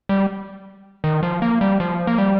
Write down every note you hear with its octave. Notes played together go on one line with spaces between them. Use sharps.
G3
D#3
F3
A#3
G3
F3
A#3
G3